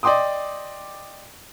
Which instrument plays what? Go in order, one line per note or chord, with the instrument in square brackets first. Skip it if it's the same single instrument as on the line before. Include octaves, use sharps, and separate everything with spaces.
[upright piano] D5 D#5 G5 C6 D6 D#6